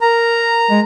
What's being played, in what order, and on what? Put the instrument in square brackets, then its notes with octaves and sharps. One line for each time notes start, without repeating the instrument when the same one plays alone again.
[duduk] A#4 [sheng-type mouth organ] A#5
[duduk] G#3